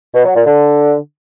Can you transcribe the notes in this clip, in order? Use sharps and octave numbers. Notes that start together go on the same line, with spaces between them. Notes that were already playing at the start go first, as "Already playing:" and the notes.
B2
F#3
A#2
D3